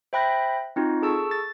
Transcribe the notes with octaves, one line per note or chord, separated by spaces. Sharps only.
C5 E5 G5 B5 F#6 A#6
C4 D#4 F4 F#4
G#4 A4 A5 C#6 E6
A6